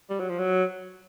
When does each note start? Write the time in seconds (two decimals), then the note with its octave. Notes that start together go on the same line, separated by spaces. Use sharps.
0.10 G3
0.20 F#3
0.29 F3
0.39 F#3